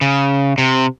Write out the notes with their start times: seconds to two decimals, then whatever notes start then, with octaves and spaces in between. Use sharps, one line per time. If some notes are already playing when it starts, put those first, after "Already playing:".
0.01 C#3
0.58 C3